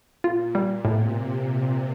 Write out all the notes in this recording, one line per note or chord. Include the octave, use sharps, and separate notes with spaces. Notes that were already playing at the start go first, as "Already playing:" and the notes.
A#2 F4
A#2 G3
A2 C3